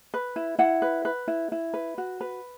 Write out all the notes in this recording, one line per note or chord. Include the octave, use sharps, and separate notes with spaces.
B4
E4
E4 F#5
B4
B4
E4
E4
B4
F#4
B4